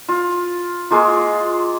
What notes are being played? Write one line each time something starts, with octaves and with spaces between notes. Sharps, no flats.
F4
G#3 A#3 F4